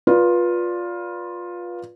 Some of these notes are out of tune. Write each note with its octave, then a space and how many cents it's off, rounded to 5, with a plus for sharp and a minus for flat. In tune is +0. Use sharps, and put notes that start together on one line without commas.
F4 +10 B4 -25 D5 -15